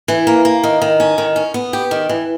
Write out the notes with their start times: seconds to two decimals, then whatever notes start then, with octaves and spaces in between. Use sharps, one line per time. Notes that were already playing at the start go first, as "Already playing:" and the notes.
0.08 E3
0.27 A#3
0.45 A#3
0.64 D#3
0.82 D#3
1.00 C#4
1.18 D#3
1.36 C#4
1.54 B3
1.73 G4
1.91 D#3
2.09 E3